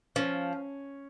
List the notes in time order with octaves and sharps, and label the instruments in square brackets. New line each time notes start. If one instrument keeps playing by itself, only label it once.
[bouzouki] F3 [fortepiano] C#4